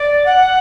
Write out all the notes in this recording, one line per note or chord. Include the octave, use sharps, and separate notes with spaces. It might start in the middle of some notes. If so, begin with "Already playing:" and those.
Already playing: D5
F#5